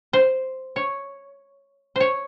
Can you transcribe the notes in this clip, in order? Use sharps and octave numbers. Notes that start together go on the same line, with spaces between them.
C5
C#5
C5 C#5